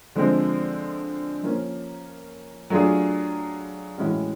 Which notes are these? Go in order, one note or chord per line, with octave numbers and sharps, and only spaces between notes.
D3 F3 G#3 C4
F3 A#3 C#4
F#3 A3 D4 F4 G#4
A2 E3 G#3 C#4 F#4